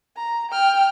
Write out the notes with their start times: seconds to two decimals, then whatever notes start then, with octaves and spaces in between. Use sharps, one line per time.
0.17 A#5
0.51 G5 F6